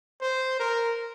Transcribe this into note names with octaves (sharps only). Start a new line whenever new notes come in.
C5
A#4